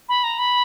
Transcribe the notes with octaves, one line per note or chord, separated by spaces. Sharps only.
B5
A#5
B5